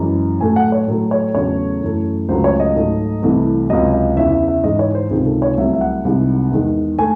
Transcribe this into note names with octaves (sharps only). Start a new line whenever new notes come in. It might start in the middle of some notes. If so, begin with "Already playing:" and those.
Already playing: F#2 E3 G#3
A2 F#3 A3 G#5
F#5
C#5
A2 F#3 A3
C#5
E2 C#3 F#3 A3 C#5
F#2 E3 A3
C#2 C#3 F#3 A3 C5
C#5
D#5
G#2 F#3 A3
C2 C3 E3 A3
C#2 C3 F#3 D#5
D#5
E2 C#3 E3 E5
E5
E5
G#2 E3 G#3 D#5
C#5
C5
C#2 C3 D#3 G#4
A4
C#5
C2 C3 F#3 A3 E5
E5
F#5
C2 C3 D#3 G#3
E2 D#3 G#3
A3 G#5